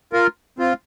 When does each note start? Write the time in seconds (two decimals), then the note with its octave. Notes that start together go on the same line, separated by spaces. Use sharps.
0.13 F4 A#4
0.59 C4 F4